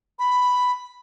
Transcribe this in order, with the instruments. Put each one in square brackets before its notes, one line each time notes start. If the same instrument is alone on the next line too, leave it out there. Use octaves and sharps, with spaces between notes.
[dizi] B5